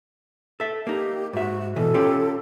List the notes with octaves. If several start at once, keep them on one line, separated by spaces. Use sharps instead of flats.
A4 E5
A#3 D#4 G4
G#2 F#4 E5
B2 E3 A4
C#4 F4 G4